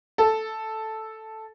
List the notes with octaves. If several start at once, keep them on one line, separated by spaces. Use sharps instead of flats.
A4